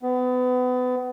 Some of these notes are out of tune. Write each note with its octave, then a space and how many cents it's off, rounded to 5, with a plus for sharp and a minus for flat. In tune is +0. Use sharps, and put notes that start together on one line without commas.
B3 +30